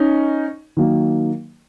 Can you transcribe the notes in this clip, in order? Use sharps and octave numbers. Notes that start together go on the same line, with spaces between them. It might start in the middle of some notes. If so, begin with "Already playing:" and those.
Already playing: C#4 D#4
D#3 F#3 A#3